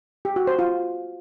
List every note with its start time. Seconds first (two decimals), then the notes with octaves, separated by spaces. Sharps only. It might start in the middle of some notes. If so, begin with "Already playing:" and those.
0.25 G4
0.36 F#4
0.47 C5
0.59 F4